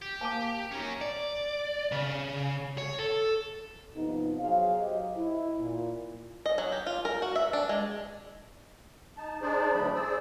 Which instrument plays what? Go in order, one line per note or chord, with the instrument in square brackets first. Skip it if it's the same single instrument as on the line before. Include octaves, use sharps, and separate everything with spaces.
[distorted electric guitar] G4
[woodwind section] A#3 [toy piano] G#5 A5 D6
[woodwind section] F#2 D#4 C#5 [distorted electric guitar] C#4 A#4
[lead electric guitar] D5
C#3
C#5
A4
[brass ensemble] G2 C3 F3 B3 D#4
F#3 G#4 C5 F5
F#3 G4 C5 D#5
E4
A#2
[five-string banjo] D#5
F#3
G4
F4
A#4
F#4
E5
D4
G#3
[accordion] D#4 A5
D4 D#4 G#4 C5 D5
D2 E3 F#3 A3 D4 B5
G#4 C5 D5 E6